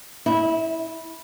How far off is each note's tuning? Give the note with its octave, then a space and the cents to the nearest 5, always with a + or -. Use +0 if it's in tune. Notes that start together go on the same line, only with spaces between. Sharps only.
E4 -15 E5 -45